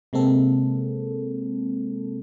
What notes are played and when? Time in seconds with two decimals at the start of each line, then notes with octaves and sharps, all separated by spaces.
0.13 C3 G#3 A#3 C4 A4